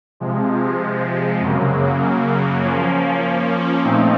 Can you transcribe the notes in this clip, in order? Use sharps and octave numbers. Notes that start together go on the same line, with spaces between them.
C3 F3 G#3
F#2 C#3 F#3 A#3
F3 A#3 C#4
A#2 F3 A3 C4 D#4